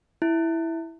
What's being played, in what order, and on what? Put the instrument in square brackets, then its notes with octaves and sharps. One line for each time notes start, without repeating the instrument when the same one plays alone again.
[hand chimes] E4